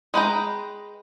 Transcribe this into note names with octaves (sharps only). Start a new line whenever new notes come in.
G#3 B4 G5 A#5